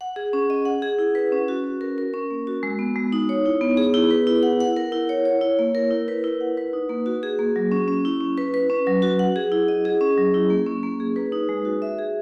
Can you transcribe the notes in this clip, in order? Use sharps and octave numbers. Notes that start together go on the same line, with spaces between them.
F#5
G#4
C#4
D#5
F#5
G#4
E4
B4
C#4
F#4
C#4
A#4
A#4
C#4
A#3
F#4
G#3
B3
G#3
D#4
C#5
E4
B3
G#4
E4
B4
E4
F#5
F#5
A#4
E4
C#5
C#5
E4
A#3
A#4
E4
B4
E4
F#5
B4
D#4
A#3
F#4
G#4
A#3
F#3
C#4
C#4
E4
C#4
B4
B4
C#4
F#3
F#4
F#5
G#4
E4
D#5
G#4
C#4
F#3
E4
A#3
C#4
A#3
G#4
B4
D#4
G#3
F#4
E5
G#4